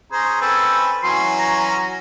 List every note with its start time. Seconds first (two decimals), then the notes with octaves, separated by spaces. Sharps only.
0.12 C#4 G#4 C5 A#5
0.41 C4 C#4 A4 B4
1.03 E3 F#3 C#4 C6
1.39 A#5